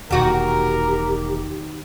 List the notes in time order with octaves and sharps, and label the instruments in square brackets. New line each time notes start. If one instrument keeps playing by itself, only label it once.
[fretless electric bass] E1 A#2 [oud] D#3 F#4 [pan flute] G4 [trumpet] A#4